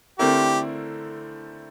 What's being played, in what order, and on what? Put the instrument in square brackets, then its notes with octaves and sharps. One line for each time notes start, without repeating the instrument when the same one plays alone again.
[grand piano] D3 A3 C4 E4 A#4 [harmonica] G4